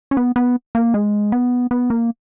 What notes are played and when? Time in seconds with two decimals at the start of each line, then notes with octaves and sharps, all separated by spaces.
0.11 C#4
0.17 B3
0.36 B3
0.75 A#3
0.94 G#3
1.32 B3
1.71 B3
1.90 A#3